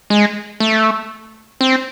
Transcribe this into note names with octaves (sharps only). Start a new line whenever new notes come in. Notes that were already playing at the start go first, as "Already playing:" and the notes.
G#3
A3
C4